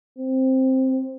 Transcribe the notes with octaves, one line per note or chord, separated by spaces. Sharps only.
C4